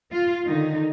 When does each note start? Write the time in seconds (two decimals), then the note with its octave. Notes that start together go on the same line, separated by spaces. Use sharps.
0.12 F4
0.45 D3 D#3 D#4